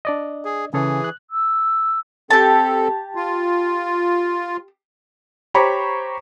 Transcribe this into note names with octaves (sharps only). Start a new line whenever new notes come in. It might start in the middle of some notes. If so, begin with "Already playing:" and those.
D4 D5 D#5
G#4
C#3 E3 G#4 A4 C#5
F#6
E6
C4 G4 A4 A5
F4
G4 C5 C#5 A#5 B5 C#6